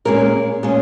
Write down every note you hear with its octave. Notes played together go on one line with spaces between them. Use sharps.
A#2 G#3 C#4 A#4
A#2 G#3 C#4